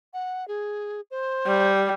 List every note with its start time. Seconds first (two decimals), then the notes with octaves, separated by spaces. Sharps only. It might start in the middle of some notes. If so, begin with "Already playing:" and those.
0.13 F#5
0.48 G#4
1.11 C5
1.46 G3